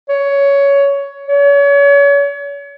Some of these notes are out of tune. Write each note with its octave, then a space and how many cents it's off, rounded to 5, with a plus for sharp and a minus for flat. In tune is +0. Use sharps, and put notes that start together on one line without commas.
C#5 +15
C#5 +35